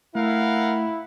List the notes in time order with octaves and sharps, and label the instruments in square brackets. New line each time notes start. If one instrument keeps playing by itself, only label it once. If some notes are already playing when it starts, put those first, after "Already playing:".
[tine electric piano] A3 [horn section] E4 [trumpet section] A#4 F5 F#5